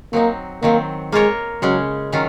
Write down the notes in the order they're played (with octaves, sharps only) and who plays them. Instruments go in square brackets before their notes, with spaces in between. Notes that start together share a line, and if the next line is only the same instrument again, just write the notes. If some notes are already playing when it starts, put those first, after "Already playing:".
[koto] F#3 C4 D#4 [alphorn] A#3
[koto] D#3 F#3 C4 [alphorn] A#3
[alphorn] G#3 [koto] A#3 F4 A#4 C#5
[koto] C#3 G#3 C#4 [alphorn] F#3
[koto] D#3 F#3 C#4 F4